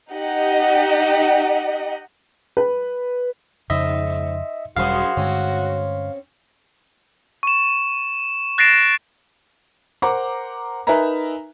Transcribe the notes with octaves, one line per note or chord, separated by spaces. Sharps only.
D#4 G4 D#5 F#5
B4
F2 G#2 C#3 D#5 E5
E1 F#2 G3 F#4 G#4 C5 F5
G2 D3 G#3 C4 C#4
C#6 E7
F#6 A6 A#6 C7 D7 E7
A#4 C5 F#5 A#5 D6
D#4 A#4 B4 E5 G#5 A#5